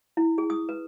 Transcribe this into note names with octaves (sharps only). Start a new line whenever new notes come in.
E4
G#4
D#6
B4